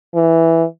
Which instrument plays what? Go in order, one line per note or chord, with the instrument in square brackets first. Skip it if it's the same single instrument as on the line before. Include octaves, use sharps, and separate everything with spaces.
[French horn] E3